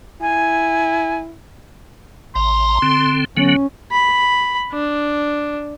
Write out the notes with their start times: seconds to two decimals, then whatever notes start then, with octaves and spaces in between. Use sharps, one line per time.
0.21 E4 G#5
2.35 A1 A#5 C6
2.82 D3 C4
3.37 D3 F#3 B3 C#4
3.91 B5
4.73 D4